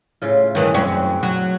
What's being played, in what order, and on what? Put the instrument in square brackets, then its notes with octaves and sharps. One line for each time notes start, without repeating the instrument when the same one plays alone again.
[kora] A2 C#3 F4
[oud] G2 D#3 E3
F#2 C4 C#5
F#3